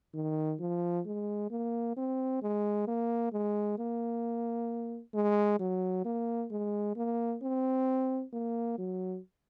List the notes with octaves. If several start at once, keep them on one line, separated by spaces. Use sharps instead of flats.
D#3
F3
G#3
A#3
C4
G#3
A#3
G#3
A#3
G#3
F#3
A#3
G#3
A#3
C4
A#3
F#3